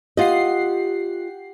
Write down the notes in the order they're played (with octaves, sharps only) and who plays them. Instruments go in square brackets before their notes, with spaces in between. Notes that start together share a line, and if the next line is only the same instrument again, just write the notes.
[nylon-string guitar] F4 D#5 [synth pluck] G4 F#5 C7